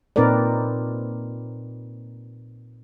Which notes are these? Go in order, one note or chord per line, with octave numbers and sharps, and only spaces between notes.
A#2 C4 D#4 A#4 B4 D5